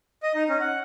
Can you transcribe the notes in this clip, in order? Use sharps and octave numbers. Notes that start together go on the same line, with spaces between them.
D#5
D#4
C#4
F#5